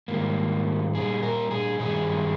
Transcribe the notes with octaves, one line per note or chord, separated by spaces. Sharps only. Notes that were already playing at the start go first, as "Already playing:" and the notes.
G#2 D#3 G3 A#3
A#2 G3 G#4
A#4
G#4
G2 D#3 G3 G#4